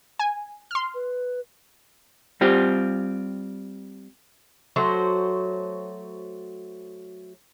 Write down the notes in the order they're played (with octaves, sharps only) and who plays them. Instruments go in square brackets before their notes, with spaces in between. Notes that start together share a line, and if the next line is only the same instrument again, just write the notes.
[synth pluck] G#5
C6 F6
[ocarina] B4
[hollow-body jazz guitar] G3 C4 F4 G4
[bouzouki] F#3 A3 F#4 C5